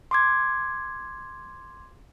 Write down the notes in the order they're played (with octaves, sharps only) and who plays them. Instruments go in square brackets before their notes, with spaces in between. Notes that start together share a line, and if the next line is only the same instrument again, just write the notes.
[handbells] C6 D6 G#6